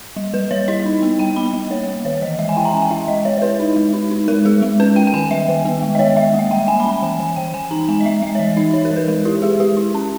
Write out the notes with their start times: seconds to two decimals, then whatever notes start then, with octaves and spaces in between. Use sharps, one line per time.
0.16 G3
0.33 G3 B4
0.51 G3 C#5
0.68 E4 D#5
0.86 D#4
1.02 B3
1.19 G3 G5
1.36 B3 B5
1.53 G3
1.70 A#3 C#5
1.88 A#3
2.05 D#3 C#5
2.22 E3 D#5
2.39 G#3 E5
2.49 G#5
2.57 E4 G5
2.65 A#5
2.73 C#4 G#5
2.82 G5
2.90 E4 E5
3.08 G#3 D#5
3.25 G#3 C#5
3.38 C#5
3.42 E4 B4
3.60 D#4
3.76 G#3
3.93 D#4
4.11 D#4
4.28 G#3 A#4
4.45 G#3 G#4
4.62 G#3
4.80 C#4 B4
4.96 C#4 G5
5.07 G5
5.14 D#3 G#5
5.31 G3 E5
5.48 D#3
5.65 B3
5.82 G#3
5.95 D#5
5.99 B3 C#5
6.16 G#3 E5
6.34 A#3
6.39 E5
6.51 G3 G5
6.68 A#3 G#5
6.80 B5
6.86 C#4
6.91 B5
7.02 E3 G#5
7.19 E3 G#5
7.36 E3 G5
7.54 E3 G#5
7.71 D#4 A#5
7.88 G#3 G#5
8.00 D#5
8.06 G#3 E5
8.22 G#3 E5
8.35 C#5
8.39 E3 D#5
8.57 D#4 E5
8.73 D#4 C#5
8.85 A#4
8.91 E3
8.96 B4
9.08 G#3 A#4
9.25 E4 G4
9.42 G#3 G#4
9.60 G#3 G4
9.77 E4
9.94 C#4